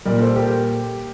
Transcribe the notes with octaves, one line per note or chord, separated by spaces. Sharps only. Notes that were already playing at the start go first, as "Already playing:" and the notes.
A#2 G3 A#4 D5
A4 C5
G4 A#4